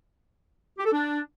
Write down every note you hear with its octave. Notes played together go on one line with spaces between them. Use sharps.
G4
A4
D4